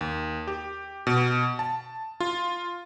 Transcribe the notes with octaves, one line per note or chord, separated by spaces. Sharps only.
D#2
G4
B2
A5
F4